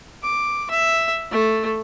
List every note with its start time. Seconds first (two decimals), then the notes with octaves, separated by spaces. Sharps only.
0.23 D6
0.71 E5
1.31 A3